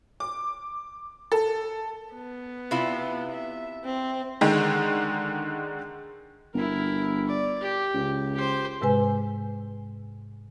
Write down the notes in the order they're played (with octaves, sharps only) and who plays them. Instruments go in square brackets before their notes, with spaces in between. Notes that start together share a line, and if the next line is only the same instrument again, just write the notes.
[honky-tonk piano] D6
A4
[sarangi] B3
[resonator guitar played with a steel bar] C3 E4 F4
[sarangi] E5
C4
[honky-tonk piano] D3 D#3 G#3
[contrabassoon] G1 [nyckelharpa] E4 A#4
[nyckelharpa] D5
G4
[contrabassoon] C#2
[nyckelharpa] G4 C5
[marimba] G#2 C3 G#3 B4 G#5